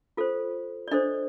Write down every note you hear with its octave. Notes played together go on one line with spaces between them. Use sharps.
F4 A4 C5
D5
D4 A4 C5 D#5